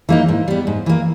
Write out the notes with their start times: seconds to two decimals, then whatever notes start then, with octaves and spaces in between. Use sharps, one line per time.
0.09 E3 A#3 D#4
0.28 G#2
0.48 G3 B3
0.67 G#2
0.86 E3 A#3